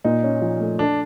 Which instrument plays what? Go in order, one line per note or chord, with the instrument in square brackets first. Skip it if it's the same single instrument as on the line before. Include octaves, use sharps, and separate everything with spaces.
[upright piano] A#2 [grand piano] D#4
[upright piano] C#4
F3
A3
[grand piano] D4 [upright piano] A4